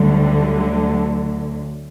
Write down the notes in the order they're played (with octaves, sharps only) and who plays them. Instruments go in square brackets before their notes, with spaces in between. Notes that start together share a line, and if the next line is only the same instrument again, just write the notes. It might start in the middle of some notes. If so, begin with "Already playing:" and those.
Already playing: [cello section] D2 D3 F#3 G3